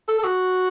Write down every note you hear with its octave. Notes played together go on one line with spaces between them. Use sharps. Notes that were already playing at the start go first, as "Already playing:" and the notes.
A4
A4
F#4